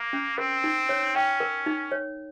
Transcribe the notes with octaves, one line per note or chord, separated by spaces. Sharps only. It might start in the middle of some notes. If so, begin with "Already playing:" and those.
Already playing: A#3
C#4
C4 A#4
D#4
C#5
C#4 G5
A#4
D#4
C#5